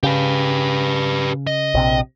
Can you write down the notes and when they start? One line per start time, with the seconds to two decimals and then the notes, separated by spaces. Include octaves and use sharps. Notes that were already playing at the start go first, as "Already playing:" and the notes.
0.03 C#3 G4 B4
1.47 D#5
1.74 A#1 C3